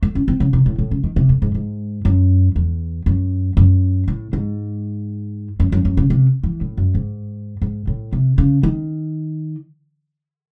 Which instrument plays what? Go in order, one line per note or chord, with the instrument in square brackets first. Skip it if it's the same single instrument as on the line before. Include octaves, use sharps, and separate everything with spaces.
[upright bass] A3
C#4
C4
C#3
C3
A2
A2
C#3
D#3
C3
A2
G#2
G#2
F#2
E2
F#2
F#2
A2
G#2
F#2
F#2
F#2
C#3
C3
E3
A2
F#2
G#2
G#2
A2
C3
C#3
D#3